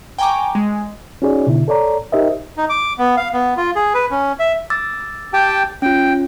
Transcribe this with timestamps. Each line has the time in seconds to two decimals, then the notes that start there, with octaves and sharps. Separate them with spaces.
0.18 G5 G#5 A#5 C#6 D6
0.55 G#3
1.22 C#4 D#4 F#4 G#4 C#5 D5
1.47 B2 D3 E4
1.68 A4 C#5 D5 A#5
2.12 D#4 G4 A#4 C5 D#5 E5
2.57 D#4
2.69 D6
2.98 B3
3.17 F5
3.33 B3
3.57 F4
3.76 G#4
3.94 B4
4.11 C#4
4.39 E5
4.70 D6 E6 A6
5.33 G4 G5 A5
5.82 C#4 F4 G5